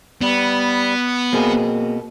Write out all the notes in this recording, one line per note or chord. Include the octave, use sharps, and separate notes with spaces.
G3 B3
B2 A#3 C4 G#4